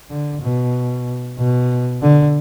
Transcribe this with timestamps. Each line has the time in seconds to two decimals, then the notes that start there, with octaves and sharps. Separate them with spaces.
0.11 D3
0.42 B2
1.39 B2
2.02 D3